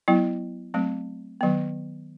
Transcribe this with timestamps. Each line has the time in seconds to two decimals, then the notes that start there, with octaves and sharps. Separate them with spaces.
0.08 F#3 B3 E4
0.74 F#3 A3 C4
1.41 D#3 F#3 B3